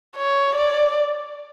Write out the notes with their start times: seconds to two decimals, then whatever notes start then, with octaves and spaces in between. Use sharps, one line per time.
0.16 C#5
0.55 D5